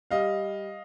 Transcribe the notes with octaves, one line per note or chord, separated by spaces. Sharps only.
G3 D#5 F5